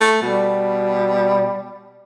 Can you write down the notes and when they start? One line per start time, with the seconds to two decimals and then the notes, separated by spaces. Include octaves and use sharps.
0.01 A3
0.22 B2 G3